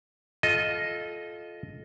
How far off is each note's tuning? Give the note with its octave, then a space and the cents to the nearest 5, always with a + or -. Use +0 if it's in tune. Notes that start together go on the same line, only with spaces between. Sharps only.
F4 +0 A4 -25 D#5 +0